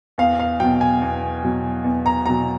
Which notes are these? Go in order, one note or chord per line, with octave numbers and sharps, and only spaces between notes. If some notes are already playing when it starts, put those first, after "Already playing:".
E2 F5
F5
B2 F#3 G5
G#5
E2
B2 F#3
E2
A#5
B2 F#3 A#5